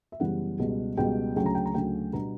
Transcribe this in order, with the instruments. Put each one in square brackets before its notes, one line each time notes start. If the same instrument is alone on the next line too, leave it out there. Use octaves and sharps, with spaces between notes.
[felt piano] E5
F#2 C#3 E3 G3 B3 F#5
C#2 B2 G3
C#2 B2 G3 G5
D2 C#3 F#3 C#4 G5
A#5
G5
A#5
D2 C#3 F#3 C#4 G5
B2 G3 B3 D4 A#5